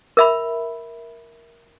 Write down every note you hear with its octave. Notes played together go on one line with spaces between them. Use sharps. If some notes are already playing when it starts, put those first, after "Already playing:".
A#4 E5 B5